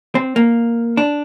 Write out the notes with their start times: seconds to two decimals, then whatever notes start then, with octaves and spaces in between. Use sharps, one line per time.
0.15 C4
0.36 A#3
0.97 D4